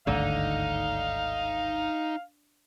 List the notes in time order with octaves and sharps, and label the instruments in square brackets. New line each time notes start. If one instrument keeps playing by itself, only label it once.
[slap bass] G#1 D2 G2 [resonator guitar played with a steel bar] D3 [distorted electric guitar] D#4 [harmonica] F5